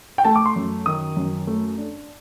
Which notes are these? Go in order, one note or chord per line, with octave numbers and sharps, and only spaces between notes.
G5
A3 A5
D6
C6
F#2
D#3 D#6
F#2
A3
D4